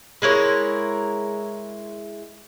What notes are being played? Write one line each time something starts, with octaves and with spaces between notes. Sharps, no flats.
G#3 E4 A#4 C#5